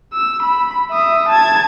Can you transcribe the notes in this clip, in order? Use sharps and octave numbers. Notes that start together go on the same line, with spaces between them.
E6
B5
E5 D#6
A5 G#6